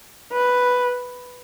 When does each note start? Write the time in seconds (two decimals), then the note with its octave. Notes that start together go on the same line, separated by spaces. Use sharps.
0.32 B4